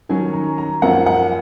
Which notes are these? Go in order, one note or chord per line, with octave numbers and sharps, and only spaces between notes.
D#3 F#3 C#4 G#5
A#5
A#5
F#2 F3 A#3 F#5
F#5